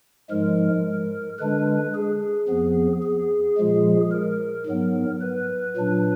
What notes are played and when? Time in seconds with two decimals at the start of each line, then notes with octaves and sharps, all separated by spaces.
0.30 G#2 F3 G#3 A#4
1.39 D3 G#3 D4 B4
1.95 G#4
2.48 F2 F3 B3
3.02 G#4
3.57 A#2 F3 G#3
4.12 A#4
4.66 G#2 F#3 B3
5.21 B4
5.77 A#2 F#3 D4